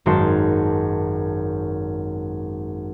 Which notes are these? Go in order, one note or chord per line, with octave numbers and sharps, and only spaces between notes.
G#1 F#2 G#3 F#4 A5 C6